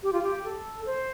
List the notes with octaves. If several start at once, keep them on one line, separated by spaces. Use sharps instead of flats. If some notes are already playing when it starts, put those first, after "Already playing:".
G4
F4
G4
A4
C5